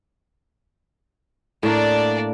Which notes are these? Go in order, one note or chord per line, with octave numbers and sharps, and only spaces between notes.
A2 A#3 D4 D5